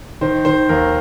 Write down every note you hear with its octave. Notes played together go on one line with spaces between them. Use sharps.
D#3 C5
D#3 C5
D#2 A#4